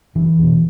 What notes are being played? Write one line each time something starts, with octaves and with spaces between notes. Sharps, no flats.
F#1 E3
E2 B2